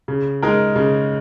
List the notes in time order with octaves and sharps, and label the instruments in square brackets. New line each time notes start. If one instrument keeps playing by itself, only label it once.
[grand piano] C#3
G#3 D#4 A#4
C#3